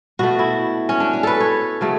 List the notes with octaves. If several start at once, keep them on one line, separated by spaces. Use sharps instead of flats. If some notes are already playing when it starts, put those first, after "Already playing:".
B2 A3 F#4
E4
C#4
D4
C#4
A4 B4
C#5
C#3 F#3 A3